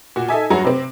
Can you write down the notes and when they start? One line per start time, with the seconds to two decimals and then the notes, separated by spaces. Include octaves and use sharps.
0.16 A#2 F#4
0.29 D#4 A4 E5 G#5
0.50 G2 F#3 F#4 F#5 A#5
0.65 C3 C4